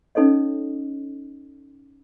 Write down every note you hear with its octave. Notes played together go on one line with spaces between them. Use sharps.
C#4 D#4 A4 C#5 D#5